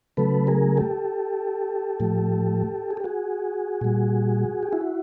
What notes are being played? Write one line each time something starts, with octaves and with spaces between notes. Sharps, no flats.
C#3 F#3 A3 A4 B4
G#4 A#4
G4 A4
A2 F3 A3
G#4
G4
F#4 G#4
A#2 G3
G4
E4 F#4